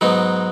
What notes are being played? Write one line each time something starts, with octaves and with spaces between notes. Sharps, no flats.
G#2 F#3 B3 D#4